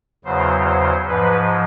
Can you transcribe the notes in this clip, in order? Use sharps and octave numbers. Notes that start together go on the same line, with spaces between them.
E2 C#3 F#3 C5
C5
G#2 F3 B4